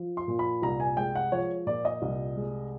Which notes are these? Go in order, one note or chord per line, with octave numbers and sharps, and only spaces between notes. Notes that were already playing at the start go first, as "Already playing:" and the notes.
Already playing: F3
C6
A#2
B5
C2 A#5
G#5
G#3 G5
F#5
F3 C#5
A#2 D5
D#5
C2
G#3